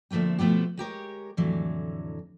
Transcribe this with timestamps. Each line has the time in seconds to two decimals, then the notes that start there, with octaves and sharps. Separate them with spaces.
0.11 D2 F3 A3 A#3 C4
0.39 B2 F3 A3 B3 G4
0.77 G#3 G4 A#4 C#5
1.37 F2 A2 D3 E3 F#3